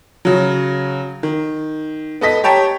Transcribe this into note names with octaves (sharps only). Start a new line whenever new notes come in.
C#3 F#3
D#3
B3 A4 D#5 B6
G4 C#5 G5 A5 A#5